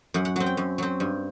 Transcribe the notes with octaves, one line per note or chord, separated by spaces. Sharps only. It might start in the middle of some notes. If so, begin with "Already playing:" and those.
F#2 F#5
F#5
F#3 C4 F#5
G5
F#2
F#3 C4
G2